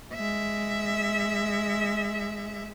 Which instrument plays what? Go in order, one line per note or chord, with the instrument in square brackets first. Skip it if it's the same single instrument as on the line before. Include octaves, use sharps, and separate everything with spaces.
[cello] G#3 E5